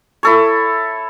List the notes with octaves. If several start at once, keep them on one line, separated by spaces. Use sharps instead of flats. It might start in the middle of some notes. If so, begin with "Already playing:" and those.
E4 A4 C#5